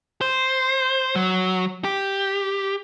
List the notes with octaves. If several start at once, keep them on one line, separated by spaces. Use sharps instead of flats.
C5
F#3
G4